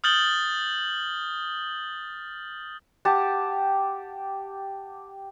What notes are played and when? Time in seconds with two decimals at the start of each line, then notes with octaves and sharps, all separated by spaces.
0.04 D#6 F6 G6 A6 F#7 G7
3.05 G4 F#5 A5